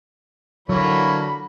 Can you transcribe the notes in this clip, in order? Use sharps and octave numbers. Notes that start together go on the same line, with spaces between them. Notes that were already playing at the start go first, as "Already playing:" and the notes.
D3 E3 F#3 A#3 F#4 C#5 B5